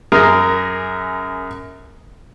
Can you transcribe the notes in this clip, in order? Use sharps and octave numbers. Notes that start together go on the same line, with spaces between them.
F#2 G#4 A#4